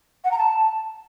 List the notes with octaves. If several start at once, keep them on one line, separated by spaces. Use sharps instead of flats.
F#5
A#5
A5